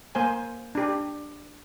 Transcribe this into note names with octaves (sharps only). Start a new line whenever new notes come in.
A#3 C5 G#5
D4 G4